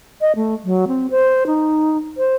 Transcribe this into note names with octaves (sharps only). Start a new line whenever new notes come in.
D#5
A3
F#3
C4
C5
D#4
C5